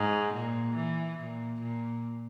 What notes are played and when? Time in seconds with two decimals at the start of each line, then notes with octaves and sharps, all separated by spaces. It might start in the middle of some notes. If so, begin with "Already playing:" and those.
Already playing: G#2
0.34 A#2
0.76 E3
1.18 A#2
1.61 A#2